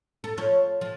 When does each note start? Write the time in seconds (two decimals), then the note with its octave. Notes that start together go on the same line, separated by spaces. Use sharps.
0.24 A4
0.38 F3 A4 C#5
0.81 F3